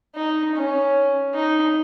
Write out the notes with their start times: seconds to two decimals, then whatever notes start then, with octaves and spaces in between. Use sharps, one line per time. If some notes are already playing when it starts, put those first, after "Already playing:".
0.15 D#4
0.55 C#4
1.34 D#4